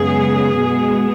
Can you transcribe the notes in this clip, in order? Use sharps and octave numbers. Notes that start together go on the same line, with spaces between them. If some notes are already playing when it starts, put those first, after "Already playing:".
Already playing: F#2 C#3 G#3 B3 G#4
B2 G#3 B3